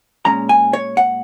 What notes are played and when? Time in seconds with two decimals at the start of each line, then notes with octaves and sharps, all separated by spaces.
0.25 A#2 G#3 C#4 A#5
0.49 G#5
0.73 C#5
0.97 F#5